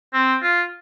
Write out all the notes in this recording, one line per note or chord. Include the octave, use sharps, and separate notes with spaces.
C4
F4